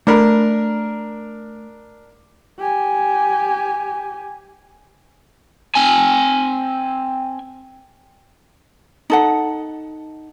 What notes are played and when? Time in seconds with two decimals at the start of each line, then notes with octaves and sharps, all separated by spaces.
0.07 A3 D4 A#4 B5
2.59 G4 G#5
5.75 C4 G#5
9.10 D#4 A4 F#5